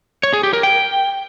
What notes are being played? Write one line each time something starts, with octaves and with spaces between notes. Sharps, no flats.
C#5
G#4
G4
A#4
G5